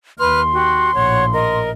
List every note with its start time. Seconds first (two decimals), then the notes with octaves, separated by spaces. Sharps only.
0.20 D#2 B4 C6 F6
0.53 F#4 G4
0.94 A#1 A2 C#5 F#5
1.33 A#4 D#5